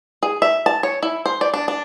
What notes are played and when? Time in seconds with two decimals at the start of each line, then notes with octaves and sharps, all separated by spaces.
0.23 G#4
0.42 E5
0.66 A5
0.83 C#5
1.03 E4
1.26 C5
1.41 D5
1.54 D4
1.68 D4